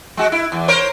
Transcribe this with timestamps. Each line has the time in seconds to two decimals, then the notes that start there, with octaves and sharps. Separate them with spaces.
0.17 G#3 F#4
0.32 E4
0.52 E2
0.68 A#4 C5 C#5